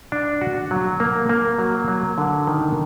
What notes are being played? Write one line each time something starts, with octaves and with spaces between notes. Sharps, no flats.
D4
F#4
F#3
A#3
A#3
F#3
F#3
D3
D#3